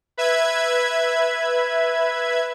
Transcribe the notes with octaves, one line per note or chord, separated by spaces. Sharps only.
B4 E5 G#6